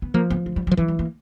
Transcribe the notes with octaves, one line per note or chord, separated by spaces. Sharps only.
B3
F3 A#3
B3
G#3
G3
F#3
F3
E3 F#3
G3
A#3